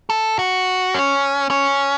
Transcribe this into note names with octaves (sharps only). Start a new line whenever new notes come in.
A4
F#4
C#4
C#4